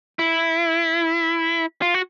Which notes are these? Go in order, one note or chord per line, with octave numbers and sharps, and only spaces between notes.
E4
F4
F#4